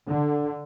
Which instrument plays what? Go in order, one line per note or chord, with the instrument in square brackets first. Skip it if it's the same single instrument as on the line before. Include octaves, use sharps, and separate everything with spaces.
[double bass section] D3